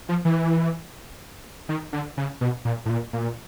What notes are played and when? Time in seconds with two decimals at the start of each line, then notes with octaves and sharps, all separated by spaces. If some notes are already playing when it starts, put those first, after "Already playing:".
0.09 F3
0.25 E3
1.69 D#3
1.93 D3
2.17 C#3
2.41 B2
2.65 A#2
2.86 A2
2.90 A#2
3.13 A#2